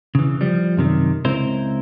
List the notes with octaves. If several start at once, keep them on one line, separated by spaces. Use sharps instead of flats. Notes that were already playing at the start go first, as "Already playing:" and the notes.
C#3 E3
F3 G3
F#2 C3 D#3
C#2 C4 E4 A#4 C5